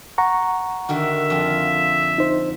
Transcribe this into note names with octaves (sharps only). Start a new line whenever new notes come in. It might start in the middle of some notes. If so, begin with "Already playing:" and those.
F#5 A#5 C#6
D3 D#3 F#4 E5
F2 F4
D#4 C5